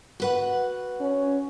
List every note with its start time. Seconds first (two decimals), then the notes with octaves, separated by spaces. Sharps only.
0.20 F#4 B4 F#5
1.01 C#4